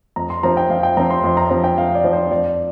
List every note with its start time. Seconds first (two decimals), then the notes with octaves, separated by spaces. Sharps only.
0.16 F2 A#5
0.30 C6
0.43 F3 C4 A#5
0.57 G5
0.70 F2 F5
0.83 G5
0.97 F3 C4 A#5
1.10 C6
1.24 F2 C6
1.37 A#5
1.51 F3 C4
1.64 G5
1.77 F2 F5
1.95 D5
2.04 F3 C4
2.13 C5
2.31 F2 D5